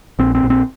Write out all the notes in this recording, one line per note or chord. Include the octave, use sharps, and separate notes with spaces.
A#1 C4
C4
A#1
C4